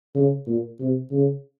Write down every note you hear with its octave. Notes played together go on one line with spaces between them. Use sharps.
C#3
A#2
C3
C#3